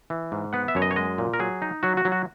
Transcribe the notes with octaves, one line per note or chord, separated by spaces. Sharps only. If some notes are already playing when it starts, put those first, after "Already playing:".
E3
G#2
B3 F#5
E5
F#2 C#5
D#5
C#5
G#3 D#5
A#2
A#4
F#3 G#4
D#4
F#3 F#4
F#4
F#3
F#4